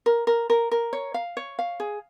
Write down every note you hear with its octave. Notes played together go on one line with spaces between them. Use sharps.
A#4
A#4
A#4
A#4
C#5
F5
C#5
F5
G#4